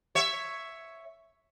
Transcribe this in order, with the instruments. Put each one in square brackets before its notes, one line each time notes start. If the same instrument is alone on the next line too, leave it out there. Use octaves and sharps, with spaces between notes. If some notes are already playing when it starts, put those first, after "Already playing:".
[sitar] C#5 E5